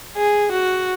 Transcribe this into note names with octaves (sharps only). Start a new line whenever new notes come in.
G#4
F#4